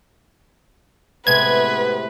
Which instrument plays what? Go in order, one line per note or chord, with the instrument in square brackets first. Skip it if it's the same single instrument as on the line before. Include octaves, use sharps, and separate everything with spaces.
[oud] A2 C3 G#3 [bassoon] B3 [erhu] B4 [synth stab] G#6